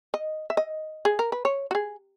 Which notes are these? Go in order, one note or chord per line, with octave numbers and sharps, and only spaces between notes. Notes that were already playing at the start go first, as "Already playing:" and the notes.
D#5
E5
D#5
G#4
A#4
B4
C#5
F#4
G#4